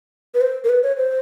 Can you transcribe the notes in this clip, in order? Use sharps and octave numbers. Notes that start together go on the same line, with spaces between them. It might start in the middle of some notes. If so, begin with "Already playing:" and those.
B4
C5
A#4
B4
C#5
C5